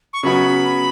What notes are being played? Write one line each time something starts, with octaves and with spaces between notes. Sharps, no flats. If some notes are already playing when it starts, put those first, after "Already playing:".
C#6
C#3 F#3 B3 F#4 B5